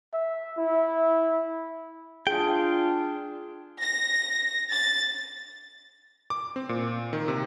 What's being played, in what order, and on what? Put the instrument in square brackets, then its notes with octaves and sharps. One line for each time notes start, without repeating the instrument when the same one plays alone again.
[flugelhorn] E5
E4
[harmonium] D4 [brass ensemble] F4 [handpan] G#4 [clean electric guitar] G5
[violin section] A#6
A6
[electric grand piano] D6
C4
A#2
D#3
C3